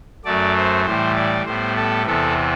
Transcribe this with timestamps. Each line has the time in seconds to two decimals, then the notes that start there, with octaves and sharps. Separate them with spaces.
0.25 F#2 F#3 A3 D5
0.56 C5
0.85 A2 E3 G3 C5
1.15 D5
1.45 A2 G3 B3 C5
1.76 A4
2.06 E2 C3 E3 B3 A4